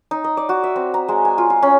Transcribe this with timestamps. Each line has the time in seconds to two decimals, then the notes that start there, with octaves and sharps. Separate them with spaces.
0.11 D#4
0.24 D#5
0.37 D5
0.49 F#4
0.63 E5
0.76 C4
0.94 A#5
1.08 G#3
1.25 G#5
1.38 F4
1.50 F4
1.63 C#4